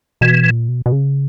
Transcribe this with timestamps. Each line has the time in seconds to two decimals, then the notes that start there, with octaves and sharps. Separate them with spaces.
0.21 B2 E3
0.44 A#2
0.68 B2
0.86 B2
0.92 C#3